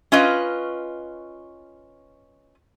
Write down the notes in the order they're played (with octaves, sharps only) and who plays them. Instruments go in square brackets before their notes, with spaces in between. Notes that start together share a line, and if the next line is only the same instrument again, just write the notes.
[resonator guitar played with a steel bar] C#4 F4 B4 D#5